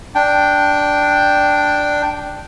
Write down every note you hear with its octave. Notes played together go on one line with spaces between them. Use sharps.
D4 G5